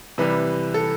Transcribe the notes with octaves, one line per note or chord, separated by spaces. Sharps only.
C3 E3 G3 B4
A4